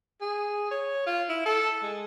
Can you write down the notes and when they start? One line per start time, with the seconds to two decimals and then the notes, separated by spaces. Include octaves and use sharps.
0.21 G#4
0.71 C#5
1.06 F4
1.29 E4
1.45 A4
1.82 G#3